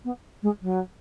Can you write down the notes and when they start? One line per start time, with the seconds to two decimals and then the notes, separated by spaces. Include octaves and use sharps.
0.04 B3
0.43 G#3
0.62 F#3